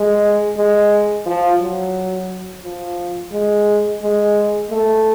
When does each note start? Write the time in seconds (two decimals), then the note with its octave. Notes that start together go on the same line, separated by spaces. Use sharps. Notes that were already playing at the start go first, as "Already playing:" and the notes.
Already playing: G#3
0.57 G#3
1.26 F3
1.60 F#3
2.63 F3
3.32 G#3
4.01 G#3
4.70 A3